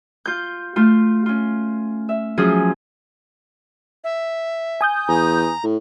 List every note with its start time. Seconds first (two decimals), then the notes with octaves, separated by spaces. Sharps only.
0.26 F4 G6
0.76 A3 F4
1.26 C#4 F4
2.09 E5
2.38 F3 F#3 C#4 F4 G#4
4.04 E5
4.81 G#5 D#6 G6
5.08 E2 A#5
5.64 A2